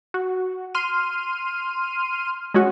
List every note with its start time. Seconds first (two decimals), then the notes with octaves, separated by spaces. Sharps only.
0.14 F#4
0.75 C6 F6 D#7
2.54 G#3 C#4 F#4